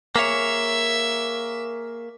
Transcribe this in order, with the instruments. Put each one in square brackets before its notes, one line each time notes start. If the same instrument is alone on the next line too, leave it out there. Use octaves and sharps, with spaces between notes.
[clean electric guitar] A#3 G#4 C#5 [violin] E5